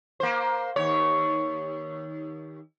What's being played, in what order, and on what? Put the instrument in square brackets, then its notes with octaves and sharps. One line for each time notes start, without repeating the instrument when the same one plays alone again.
[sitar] A#3 C5
D#2 C#5